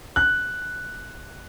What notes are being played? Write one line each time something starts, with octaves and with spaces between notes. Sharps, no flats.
F#6